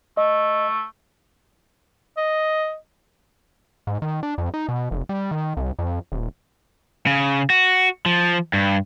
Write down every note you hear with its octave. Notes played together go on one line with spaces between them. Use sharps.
A3 D#5
D#5
G#2
D#3
D4
F2
D#4
B2
F1
G3
D#3
C2
F2
D#1
C#3
F#4
F3
G2